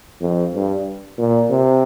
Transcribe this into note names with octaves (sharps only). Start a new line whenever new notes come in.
F2
G2
A#2
C3